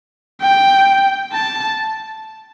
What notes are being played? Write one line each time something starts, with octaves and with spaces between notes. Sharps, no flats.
G5
A5